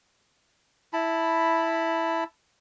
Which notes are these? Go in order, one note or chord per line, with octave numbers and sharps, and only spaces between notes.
E4 A5 B5